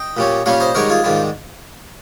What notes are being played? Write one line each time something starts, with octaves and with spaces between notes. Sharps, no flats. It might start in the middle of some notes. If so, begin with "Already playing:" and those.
Already playing: D#5 G5
A#2 G3 C#4
A#2 G3 C#4 C#5 F5
C5 D#5
G#2 D#3 G3 A#4 C#5
F4 G#4
G#2 D#3 G3 F4